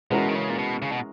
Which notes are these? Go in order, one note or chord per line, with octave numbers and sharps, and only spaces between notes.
B2 E3 G#3 C#4 F#4 A#4
D#3
C#3
A#2
B2
C#3
B2